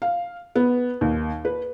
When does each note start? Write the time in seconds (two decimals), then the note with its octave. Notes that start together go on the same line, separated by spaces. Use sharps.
0.02 F5
0.55 B3
1.01 D#2
1.45 B4